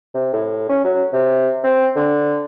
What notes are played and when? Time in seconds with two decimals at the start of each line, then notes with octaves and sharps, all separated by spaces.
0.15 C3
0.33 A2
0.69 C#4
0.85 F#3
1.13 C3
1.64 C4
1.96 D3